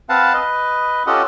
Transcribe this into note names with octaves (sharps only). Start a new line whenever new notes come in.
C4 B4 F5 F#5 A5
B4 D#5
C#4 F4 G4 A4 D#5 F#5